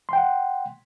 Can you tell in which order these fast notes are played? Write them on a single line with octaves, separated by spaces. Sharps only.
C6 G5 F#5